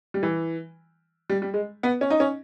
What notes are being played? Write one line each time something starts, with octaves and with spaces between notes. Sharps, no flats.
G3
E3
G3
G3
G#3
B3
C#4
D#4
C#4